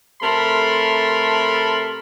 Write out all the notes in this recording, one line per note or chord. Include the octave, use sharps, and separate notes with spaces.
C3 A3 A4 A#4 B5 C6